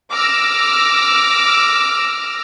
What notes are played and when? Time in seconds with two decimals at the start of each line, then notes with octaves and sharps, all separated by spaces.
0.13 D6 E6 F6 A#6